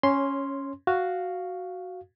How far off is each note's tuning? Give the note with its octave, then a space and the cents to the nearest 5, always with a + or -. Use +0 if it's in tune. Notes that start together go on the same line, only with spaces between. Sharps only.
C#4 +0 C#5 -20 C6 +0
F#4 +0 F5 +0